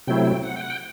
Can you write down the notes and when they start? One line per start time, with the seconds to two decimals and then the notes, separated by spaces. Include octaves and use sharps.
0.07 C3 F#3 A3 C4 E4 G5
0.25 G5
0.43 F#5
0.56 G5
0.60 F#5
0.70 G5